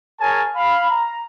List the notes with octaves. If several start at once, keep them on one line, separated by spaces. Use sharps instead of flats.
G#4 A#4 C#5 G#5 A5
F5 B5
A#5